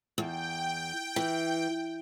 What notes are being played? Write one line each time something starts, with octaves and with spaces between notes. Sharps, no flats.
E2 G5
E3